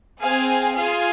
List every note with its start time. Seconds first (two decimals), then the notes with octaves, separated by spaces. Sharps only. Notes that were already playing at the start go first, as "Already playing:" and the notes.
0.20 C4 G#4 F5 G#5
0.76 F4 G#4 F5 G#5